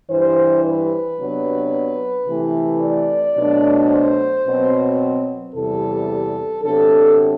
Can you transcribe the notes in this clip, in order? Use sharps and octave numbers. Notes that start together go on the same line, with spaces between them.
G2 E3 G3 C5
B4
C3 F#3 B3 D4
C3 E3 A3
D5
B2 F#3 A3 D4
C5
B2 F#3 C4
E2 C3 G3 A4
C3 F#3 B3 D4 A4